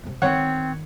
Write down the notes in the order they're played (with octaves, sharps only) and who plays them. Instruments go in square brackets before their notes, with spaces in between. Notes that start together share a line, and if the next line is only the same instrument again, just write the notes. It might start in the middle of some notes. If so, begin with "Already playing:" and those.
[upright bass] C3 C4
[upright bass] D#3 [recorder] C4 [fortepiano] C#5 F#5